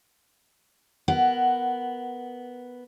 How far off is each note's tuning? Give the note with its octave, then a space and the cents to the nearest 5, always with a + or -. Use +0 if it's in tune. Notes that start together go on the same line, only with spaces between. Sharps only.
B3 +0 A#4 +0 F#5 +15